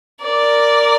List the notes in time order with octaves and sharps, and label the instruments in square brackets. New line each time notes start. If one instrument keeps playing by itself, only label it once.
[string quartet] A#4 D5